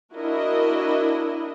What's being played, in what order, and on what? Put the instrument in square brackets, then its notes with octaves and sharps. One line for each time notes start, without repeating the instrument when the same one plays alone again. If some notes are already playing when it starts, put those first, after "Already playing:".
[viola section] D4 E4 F#4 A#4 D#5